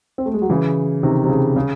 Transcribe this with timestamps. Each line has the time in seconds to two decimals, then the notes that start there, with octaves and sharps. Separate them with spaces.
0.18 C4
0.26 A3
0.34 G#3
0.42 F#3
0.50 C#3 E3
1.03 C3 D#3
1.24 C3
1.29 C#3
1.56 C#3